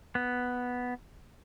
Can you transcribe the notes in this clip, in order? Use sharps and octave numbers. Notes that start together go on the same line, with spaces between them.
B3